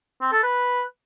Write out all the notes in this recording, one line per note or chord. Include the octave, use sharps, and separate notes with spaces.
C4
A4
B4